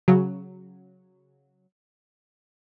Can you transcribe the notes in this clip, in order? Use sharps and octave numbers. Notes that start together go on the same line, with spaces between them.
C#3 F#3